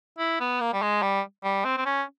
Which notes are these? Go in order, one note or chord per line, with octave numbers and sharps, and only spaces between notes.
E4
B3
A#3
G3
G#3
G3
G3
C4
C4
C#4